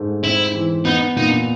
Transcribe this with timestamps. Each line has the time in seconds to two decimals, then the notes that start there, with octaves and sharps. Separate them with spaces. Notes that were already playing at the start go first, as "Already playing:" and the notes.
Already playing: G#2 A3
0.23 C4 E4
0.54 E3
0.85 B3 D#4
1.16 A#2 D#4